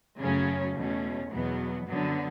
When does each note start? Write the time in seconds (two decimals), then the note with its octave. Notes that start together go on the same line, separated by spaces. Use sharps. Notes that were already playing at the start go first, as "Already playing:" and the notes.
0.16 F#2 C#3 F#3 A3 C#4
0.74 E2 B2 A3 C#4
1.30 E2 B2 F#3 B3
1.87 F#2 D3 F#3 B3